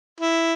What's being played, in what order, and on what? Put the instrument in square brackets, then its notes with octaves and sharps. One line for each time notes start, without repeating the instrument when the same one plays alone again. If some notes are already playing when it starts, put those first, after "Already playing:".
[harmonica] E4